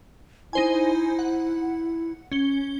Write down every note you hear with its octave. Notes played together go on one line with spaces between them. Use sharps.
D#4 E4 C5 G#5
F#5
C#4 G7